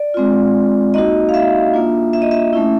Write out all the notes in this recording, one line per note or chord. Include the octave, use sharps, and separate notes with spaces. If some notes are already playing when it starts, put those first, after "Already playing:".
Already playing: D5
G#3 C4 F4
A#3 D#4 F#4 D#5
F5
E5
A#3 D4 F4
E5
D#5
E5
A3 C#4 E4